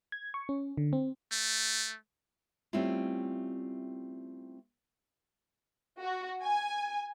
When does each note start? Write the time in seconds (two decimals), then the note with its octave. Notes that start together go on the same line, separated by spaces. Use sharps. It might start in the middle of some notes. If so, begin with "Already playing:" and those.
0.12 G#6
0.34 C#6
0.49 C#4
0.77 D3
0.93 C4
1.32 A3
2.73 G3 A3 C4 C#4 E4 F4
6.02 F#4
6.43 G#5